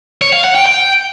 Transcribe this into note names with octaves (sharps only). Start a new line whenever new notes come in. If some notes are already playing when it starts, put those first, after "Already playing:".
C#5
F5
F#5
G5
G5